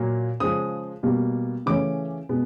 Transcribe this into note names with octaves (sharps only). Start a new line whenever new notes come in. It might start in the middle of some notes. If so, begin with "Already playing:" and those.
Already playing: A#2 F#3 A#3
C#3 F3 G#3 D#6
B2 G3 A#3
C#3 E3 A3 C#4 D6
B2 G#3 B3